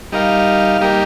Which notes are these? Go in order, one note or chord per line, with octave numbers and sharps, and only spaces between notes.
G3 D#4 A#4 F5
G3 A#3 D#4 G4 A#4